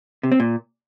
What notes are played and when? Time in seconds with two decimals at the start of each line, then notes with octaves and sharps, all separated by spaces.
0.23 C3
0.32 C4
0.40 A#2